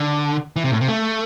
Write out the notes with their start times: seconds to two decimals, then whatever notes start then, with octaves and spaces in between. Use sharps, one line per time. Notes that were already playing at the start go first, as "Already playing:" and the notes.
Already playing: D3
0.56 E3
0.64 C3
0.72 A2
0.81 C3
0.88 A3